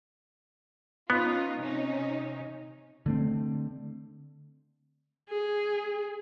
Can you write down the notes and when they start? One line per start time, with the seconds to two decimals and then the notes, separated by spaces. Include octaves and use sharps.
1.10 B3 C#4 D#4 F4
1.59 C3 C#4 D#4
3.06 D3 A3 C4
5.29 G#4